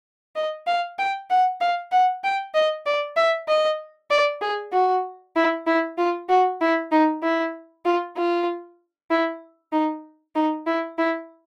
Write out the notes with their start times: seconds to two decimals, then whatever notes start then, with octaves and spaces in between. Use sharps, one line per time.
0.35 D#5
0.67 F5
0.98 G5
1.30 F#5
1.61 F5
1.92 F#5
2.24 G5
2.54 D#5
2.86 D5
3.16 E5
3.48 D#5
4.10 D5
4.41 G#4
4.72 F#4
5.36 E4
5.67 E4
5.98 F4
6.29 F#4
6.61 E4
6.92 D#4
7.23 E4
7.85 F4
8.16 F4
9.10 E4
9.72 D#4
10.35 D#4
10.66 E4
10.98 E4